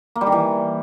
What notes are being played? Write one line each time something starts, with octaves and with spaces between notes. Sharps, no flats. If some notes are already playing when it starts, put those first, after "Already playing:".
A#3
G3
D#3
E3